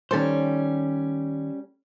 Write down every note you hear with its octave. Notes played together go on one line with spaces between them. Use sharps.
D#3 G3 C#4 A4 C5